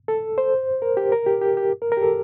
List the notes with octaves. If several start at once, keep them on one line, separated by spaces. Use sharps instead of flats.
A4
C5
A#4
G4
A#4
G4
G4
G4
A#4
A#4
G4
A4